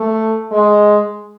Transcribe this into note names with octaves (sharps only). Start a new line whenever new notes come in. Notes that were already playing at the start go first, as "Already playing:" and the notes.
Already playing: A3
G#3